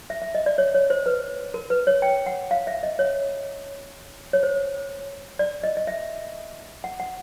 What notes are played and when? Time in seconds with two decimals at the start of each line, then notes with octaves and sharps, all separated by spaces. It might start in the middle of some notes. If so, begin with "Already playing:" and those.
0.10 E5
0.22 E5
0.35 D#5
0.46 D5
0.58 C#5
0.75 C#5
0.90 C5
1.06 B4
1.54 A#4
1.70 B4
1.87 C#5
2.02 G5
2.26 F#5
2.51 F5
2.67 E5
2.83 D#5
2.99 C#5
4.33 C#5
4.43 C5
5.39 D5
5.63 D#5
5.77 D#5
5.87 E5
6.84 F#5
7.00 F#5